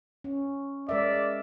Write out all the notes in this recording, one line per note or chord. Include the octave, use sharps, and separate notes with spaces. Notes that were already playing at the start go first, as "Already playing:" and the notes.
C#4
G#3 A#4 D5 E5